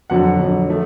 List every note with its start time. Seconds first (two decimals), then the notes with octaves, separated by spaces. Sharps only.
0.10 F2 D3 F#3 F#5
0.39 F2 D3 F#3
0.69 F3 A3